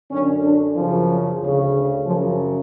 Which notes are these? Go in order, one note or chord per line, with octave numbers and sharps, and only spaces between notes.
F#2 D3 C#4
D4
F#2 C#3 F3
D2 C#3
F#2 C#3 F3